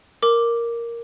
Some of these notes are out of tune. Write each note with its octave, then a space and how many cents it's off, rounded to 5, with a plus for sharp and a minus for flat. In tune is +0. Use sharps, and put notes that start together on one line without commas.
A#4 +0 D6 +0